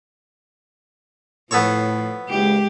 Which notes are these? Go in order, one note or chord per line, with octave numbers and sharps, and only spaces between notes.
A2 F3 B3 A4 C#5
F#1 C#2 G#3 G4